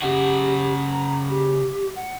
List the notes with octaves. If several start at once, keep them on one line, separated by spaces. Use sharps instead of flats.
C#3 F#4 G4
A#5
G4
F#5